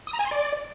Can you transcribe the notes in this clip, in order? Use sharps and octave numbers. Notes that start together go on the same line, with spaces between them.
D#6
A#5
G#5
C6
D5